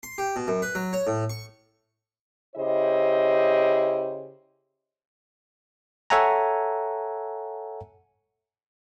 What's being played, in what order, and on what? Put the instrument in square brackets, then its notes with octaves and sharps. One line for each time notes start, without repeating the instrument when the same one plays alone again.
[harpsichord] C6
G4
B2
F#2
B4
F#3
C#5
A2
C#6
[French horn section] C#3 E4 G4 C5 D#5
[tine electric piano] A4 C#5 E5 F#5 G#5 A#5